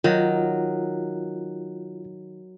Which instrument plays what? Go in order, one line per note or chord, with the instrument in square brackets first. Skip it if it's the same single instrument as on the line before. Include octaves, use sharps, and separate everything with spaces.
[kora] D#3 [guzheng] F#3 [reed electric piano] F4